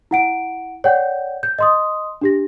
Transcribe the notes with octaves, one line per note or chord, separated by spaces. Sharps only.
E4 F#5 D7
C#5 D5 F#5 G5 G6
G6
D#5 C6 D#6
D4 G4 A#6